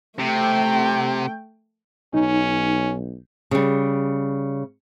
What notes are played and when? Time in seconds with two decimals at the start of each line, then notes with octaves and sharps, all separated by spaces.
0.19 C3 A3 G5
2.14 B1 C#4 D#4
3.51 C#3 G3